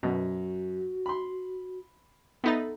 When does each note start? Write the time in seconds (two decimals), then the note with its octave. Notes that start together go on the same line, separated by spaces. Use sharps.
0.03 F#2 B2 F#4
1.06 B5 C6
2.44 B3 D#4 A4 E5 B5 A6